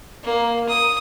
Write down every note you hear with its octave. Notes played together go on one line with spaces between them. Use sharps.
A#3
D#6